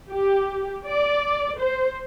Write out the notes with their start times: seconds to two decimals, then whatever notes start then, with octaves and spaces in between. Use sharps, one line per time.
0.10 G4
0.85 D5
1.58 C5